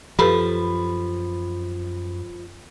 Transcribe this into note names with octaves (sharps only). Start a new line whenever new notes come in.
F#2 F3 G4 A4 B4 B5